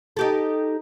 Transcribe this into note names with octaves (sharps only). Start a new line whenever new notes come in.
D#4 G4 A4